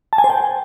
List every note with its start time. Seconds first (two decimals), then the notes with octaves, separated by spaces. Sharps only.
0.13 A5
0.18 G#5
0.24 C5
0.30 G5